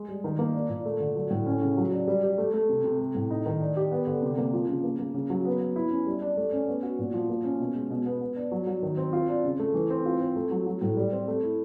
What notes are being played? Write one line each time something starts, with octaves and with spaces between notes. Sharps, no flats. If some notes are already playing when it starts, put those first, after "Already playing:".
Already playing: G#3
G3
D#3
A#3
D4
A#2
A3
D3
F#3
A2
C#4
C#3
F#3
D4
G3
G4
A3
A3
C3
C3
A3
A2
D#4
D#3
D4
G4
B3
D3
C3
A#3
F3
C#3
A#3
A#3
C#3
F#3
B3
B3
E4
C#4
G3
D4
A3
C#4
B3
F#4
A#2
F3
A#3
C#4
B2
G#3
B2
B3
B3
D4
F#3
F#3
D#3
C4
F4
D4
C#3
A3
E3
C4
F4
C4
A3
F#3
F#3
A2
G3
C4
A3
E4